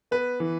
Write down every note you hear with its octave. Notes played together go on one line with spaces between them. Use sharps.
B3 B4
E3